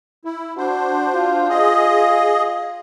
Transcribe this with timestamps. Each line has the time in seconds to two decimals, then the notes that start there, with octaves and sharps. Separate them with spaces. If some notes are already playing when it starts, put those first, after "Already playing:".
0.25 E4
0.57 D4 F#4 C5
1.15 F4
1.49 G#4 D#5